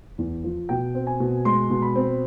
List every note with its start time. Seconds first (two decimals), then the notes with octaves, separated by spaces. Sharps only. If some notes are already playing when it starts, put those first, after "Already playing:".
0.18 E2
0.44 F3
0.69 B2 G5
0.95 C4
1.07 G#5
1.20 B2
1.45 G#3 C6
1.70 B2
1.82 B5
1.95 C4